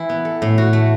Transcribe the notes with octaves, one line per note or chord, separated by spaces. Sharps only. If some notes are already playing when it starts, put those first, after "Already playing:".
Already playing: E3 E4
B3
A4
A2
F#4
A3